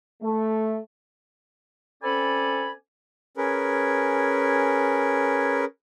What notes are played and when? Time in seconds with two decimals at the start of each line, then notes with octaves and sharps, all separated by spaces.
0.22 A3
2.02 C4 C#4 A4 D5 G#5 B5
3.37 C#4 G#4 A#4 B4